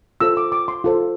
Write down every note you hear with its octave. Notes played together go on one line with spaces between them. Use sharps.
F4 A4 C5 E6
D6
D6
C6
F4 A4 C5